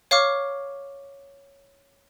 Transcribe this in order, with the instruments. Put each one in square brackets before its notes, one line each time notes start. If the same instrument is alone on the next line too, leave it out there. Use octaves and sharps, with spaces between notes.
[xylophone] C#5 F5 C#6 D6 F6